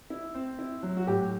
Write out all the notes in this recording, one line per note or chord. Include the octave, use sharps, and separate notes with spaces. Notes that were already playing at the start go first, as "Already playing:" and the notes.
E4
C4
E4
F#3
F#4
A2 G4